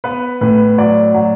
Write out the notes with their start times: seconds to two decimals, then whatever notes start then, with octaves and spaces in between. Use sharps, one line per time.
0.04 B3 B4
0.41 A2 B4
0.78 F#3 D5
1.14 F#3